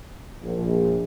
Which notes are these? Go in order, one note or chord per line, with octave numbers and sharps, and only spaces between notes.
A#1